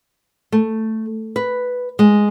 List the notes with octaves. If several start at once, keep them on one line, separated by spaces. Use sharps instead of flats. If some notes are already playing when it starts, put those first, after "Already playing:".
A3
B4
G#3